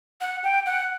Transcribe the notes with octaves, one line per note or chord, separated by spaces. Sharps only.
F#5
G5
F#5